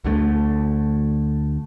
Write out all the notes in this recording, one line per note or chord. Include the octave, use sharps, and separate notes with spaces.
D2 D3 F#3 A3